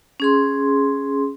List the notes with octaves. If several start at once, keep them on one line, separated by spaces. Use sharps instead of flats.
C#4 G#4 C6